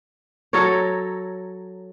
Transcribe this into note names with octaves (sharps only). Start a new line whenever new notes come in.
F#3 A4 A#4 C#5